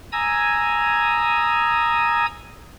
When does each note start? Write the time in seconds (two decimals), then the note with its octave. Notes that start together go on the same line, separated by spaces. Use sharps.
0.12 G#5 A#5 D#6 E6 G#6